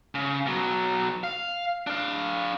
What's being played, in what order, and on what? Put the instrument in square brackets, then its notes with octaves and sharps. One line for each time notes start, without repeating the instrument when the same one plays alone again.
[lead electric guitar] C#3
B2 F#3
F5
D4 F5